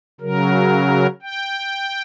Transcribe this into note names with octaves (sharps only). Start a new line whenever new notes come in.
C#3 F#3 A#4
G5